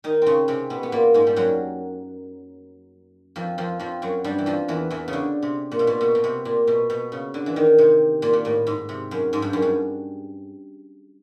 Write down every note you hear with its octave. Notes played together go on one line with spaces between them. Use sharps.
D#3 D#4
C#3 C4 C#4
C3 C4
B2 B3
B3
A#2 A#3
G#2 G#3
G3
F#2 F#3
F2 F3
F2 F3
F2 F3
F#2 F#3
G2 G3
E3
F2 F3
E2 E3
E2 E3
C#3
D3
C3
A#2
B2
A#2
B2
B2
C3
A#2
B2
B2
C#3
D3
E3
D#3
C3
A#2
A#2
A2
G#2
C3
F#2
G#2
G2
F#2
G2